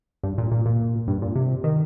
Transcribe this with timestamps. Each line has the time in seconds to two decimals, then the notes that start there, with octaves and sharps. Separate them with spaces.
0.23 G2
0.38 A#2
0.52 A#2
0.66 A#2
1.08 G2
1.22 A#2
1.35 C3
1.64 D#3